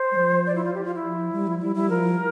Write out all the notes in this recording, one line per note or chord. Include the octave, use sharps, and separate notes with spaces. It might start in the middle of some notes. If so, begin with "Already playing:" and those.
Already playing: C5
G3
F3
D5
E4
F4
G4
F4
E4
F3
G3
F3
G3 E4
G3 E4
F3 A#4